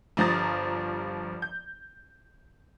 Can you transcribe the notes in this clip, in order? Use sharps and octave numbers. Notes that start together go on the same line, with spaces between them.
G1 G2 F3 A#5 D#6 A6
G6